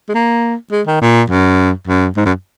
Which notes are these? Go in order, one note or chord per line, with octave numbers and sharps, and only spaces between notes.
G#3
A#3
G#3
D#3
A#2
F#2
F#2
G#2
F#2